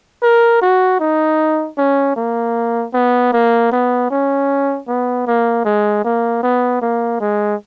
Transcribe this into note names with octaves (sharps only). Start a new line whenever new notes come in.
A#4
F#4
D#4
C#4
A#3
B3
A#3
B3
C#4
B3
A#3
G#3
A#3
B3
A#3
G#3